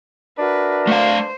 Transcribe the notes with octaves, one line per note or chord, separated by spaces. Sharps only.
D4 F#4 A#4 B4 E5
A3 C5 F5